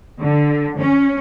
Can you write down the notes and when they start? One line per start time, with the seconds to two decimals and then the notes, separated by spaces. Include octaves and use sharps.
0.20 D3
0.78 C#4